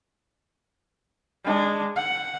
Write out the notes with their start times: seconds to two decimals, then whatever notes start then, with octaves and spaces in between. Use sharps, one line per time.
1.44 G#3 D4
1.96 F#5